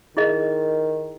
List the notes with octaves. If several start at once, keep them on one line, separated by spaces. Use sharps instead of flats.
D#3 E4 G#4 D#5